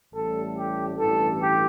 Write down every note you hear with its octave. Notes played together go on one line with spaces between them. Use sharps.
A1 A2 G3 A4
G4
A1 G2 E3 A4
G4